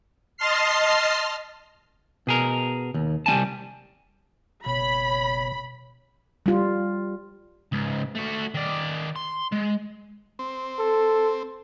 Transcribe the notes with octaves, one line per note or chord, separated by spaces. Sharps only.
D#5 A5 C6 F6 C7
B2 G#4 A#4
D#2
C2 G3 A#3 G#5 A5
F#1 B2 C#5 B5
G3 F4
C#2 G#2
A3 F#4
D#3 D5
C6
G#3
C4
A4